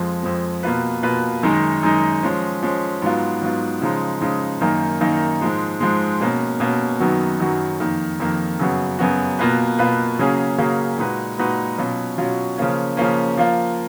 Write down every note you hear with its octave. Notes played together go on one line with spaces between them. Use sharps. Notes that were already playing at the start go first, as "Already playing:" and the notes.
Already playing: F2 F3 G#3
F2 F3 G#3
B2 A#3 F4 B4
B2 A#3 F4 B4
F#2 D#3 G#3 D#4
F#2 D#3 G#3 D#4
F3 G#3 C#4
F3 G#3 C#4
G#2 F#3 B3 F4
G#2 F#3 B3 F4
C#3 F3 G#3 D#4
C#3 F3 G#3 D#4
F#2 D#3 A#3 D#4
F#2 D#3 A#3 D#4
G#2 F3 G#3
G#2 F3 G#3
B2 A#3 C#4
B2 A#3 C#4
F#2 D#3 F#3 B3 F#4
F#2 D#3 F#3 B3 F#4
F2 D#3 A#3
F2 D#3 A#3
F#2 C#3 F#3 B3 F#4
F#2 C#3 F#3 B3 F#4
B2 A#3 F4 B4
B2 A#3 F4 B4
C#3 F#3 A#3 C#4 G#4
C#3 F#3 A#3 C#4 G#4
A#2 G#3 D#4 F#4 B4
A#2 G#3 D#4 F#4 B4
B2 F#3 C#4 F4
B2 F#3 C#4 F4
C#3 F3 A#3 C#4
C#3 F3 A#3 C#4
F3 A#3 F4